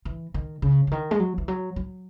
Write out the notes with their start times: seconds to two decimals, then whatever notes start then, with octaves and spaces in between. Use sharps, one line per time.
0.05 E3
0.34 D#3
0.62 C#3
0.87 C#3
0.91 D#3
1.11 G#3
1.20 F#3
1.38 E3
1.48 F#3
1.76 F#3